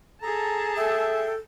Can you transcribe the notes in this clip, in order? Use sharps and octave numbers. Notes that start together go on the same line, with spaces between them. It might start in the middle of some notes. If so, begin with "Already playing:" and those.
G#4 A4 A5 A#5
A4 E5 G5